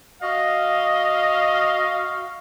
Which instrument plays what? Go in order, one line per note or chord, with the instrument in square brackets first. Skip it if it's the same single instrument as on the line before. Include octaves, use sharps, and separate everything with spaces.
[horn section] F#4 F5 [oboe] D#5